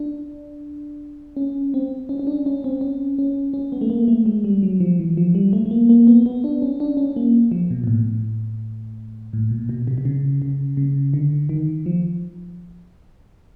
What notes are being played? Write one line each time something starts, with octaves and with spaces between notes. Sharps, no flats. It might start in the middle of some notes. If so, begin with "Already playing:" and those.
Already playing: D4
C#4
C4
C#4
C#4
D4
C#4
C4
C#4
C#4
C#4
B3
A3
A#3
A3
G#3
G3
F#3
F3
E3
F3
G3
A3
A3
A#3
A#3
B3
B3
D4
C#4
D4
C#4
A#3
F3
B2
A#2
A2
A2
A#2
B2
C3
C3
C#3
C#3
C#3
D3
D#3
F3